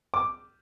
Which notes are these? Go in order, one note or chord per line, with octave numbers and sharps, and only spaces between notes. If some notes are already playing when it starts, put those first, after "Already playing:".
D6